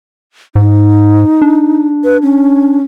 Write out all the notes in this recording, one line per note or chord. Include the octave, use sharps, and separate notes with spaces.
G#2 D#4
D4
B4
C#4